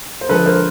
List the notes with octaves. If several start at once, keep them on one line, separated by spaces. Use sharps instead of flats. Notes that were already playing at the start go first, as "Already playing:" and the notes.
C5
D3 F3 G#3 A4 B4
A#4 C5